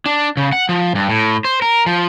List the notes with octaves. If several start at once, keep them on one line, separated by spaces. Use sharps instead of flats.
D4
C#3
F#5
F3
G2
A2
C5
A#4
F3